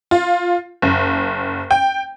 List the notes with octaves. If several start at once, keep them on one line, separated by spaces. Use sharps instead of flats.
F4
F#1
G5